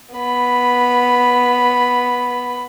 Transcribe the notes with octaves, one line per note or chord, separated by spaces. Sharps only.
B3 B5